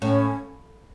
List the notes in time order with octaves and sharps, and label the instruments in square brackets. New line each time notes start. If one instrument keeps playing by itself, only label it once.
[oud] A2 [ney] C#4